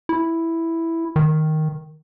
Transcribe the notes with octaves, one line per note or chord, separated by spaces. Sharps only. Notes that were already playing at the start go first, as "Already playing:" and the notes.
E4
D#3